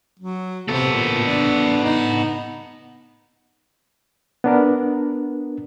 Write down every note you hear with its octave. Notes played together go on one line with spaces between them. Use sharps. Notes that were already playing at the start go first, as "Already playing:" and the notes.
F#3
C3 B3 A4
A#2
D4
D#4
B3 D4 A#4